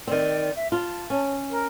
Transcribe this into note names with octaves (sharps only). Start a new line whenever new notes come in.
D#3 C4 D5
E5
F4 A5
C#4
A#4